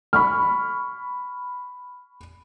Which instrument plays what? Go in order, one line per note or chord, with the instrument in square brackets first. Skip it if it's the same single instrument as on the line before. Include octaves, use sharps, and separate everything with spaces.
[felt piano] B5 C#6 F6